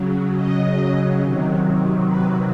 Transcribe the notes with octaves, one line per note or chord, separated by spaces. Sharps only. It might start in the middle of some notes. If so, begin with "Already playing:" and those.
Already playing: C#3 F#3
D#5
C3 D#3 F#3
B4